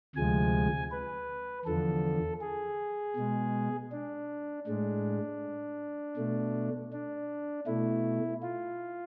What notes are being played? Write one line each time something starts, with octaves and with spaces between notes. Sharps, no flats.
D2 C3 F3 G#3 G#5
B4
E2 D3 F3 A4
G#4
B2 G#3
D4
A2 G#3 D4
B2 A3
D4
B2 A3 E4
F4